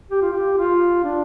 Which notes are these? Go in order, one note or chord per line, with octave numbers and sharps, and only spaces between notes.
G4
F4
G4
F4
D4